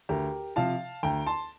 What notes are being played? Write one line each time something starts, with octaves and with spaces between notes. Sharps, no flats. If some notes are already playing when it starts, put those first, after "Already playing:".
D2 G4 A#4
C3 F3 F5 A5
D2 G5 A#5
A5 C6